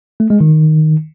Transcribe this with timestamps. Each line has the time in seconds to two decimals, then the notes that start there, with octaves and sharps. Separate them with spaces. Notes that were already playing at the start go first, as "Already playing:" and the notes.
0.20 A3
0.30 G#3
0.40 D#3